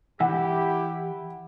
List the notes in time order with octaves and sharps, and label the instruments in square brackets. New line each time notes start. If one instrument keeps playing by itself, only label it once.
[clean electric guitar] E3 E5 [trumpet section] E4 G4 [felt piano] F#5